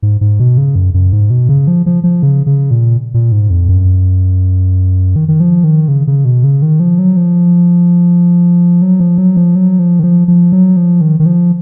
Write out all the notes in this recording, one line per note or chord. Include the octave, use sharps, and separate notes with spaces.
G#2
G#2
B2
C#3
F#2
F#2
G#2
B2
C#3
F3
F3
F3
C#3
C#3
A#2
A#2
G#2
F2
F#2
D#3
D#3
F3
D#3
C#3
C#3
B2
C#3
D#3
F3
F#3
F3
F#3
F3
F#3
F3
F#3
F3
D#3
F3
F3
F#3
F3
D#3
D#3
F3